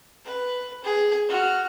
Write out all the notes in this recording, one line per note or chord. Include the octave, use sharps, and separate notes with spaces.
B4
G#4
F#4 F6